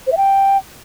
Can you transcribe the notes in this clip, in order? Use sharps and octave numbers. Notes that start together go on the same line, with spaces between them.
C5
E5
G5